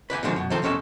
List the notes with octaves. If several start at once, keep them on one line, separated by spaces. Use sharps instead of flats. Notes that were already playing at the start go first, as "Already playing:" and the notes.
B4 D5 G5 G#5
B2 D3 D#3 F3 G#3 C4
F#2 B2
D#3 F3 C4 A4
B1 E2 C3 C#4 A4 D#5